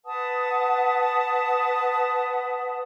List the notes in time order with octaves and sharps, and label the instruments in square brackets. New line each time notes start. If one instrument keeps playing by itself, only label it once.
[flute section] B4 F#5 A5 D#6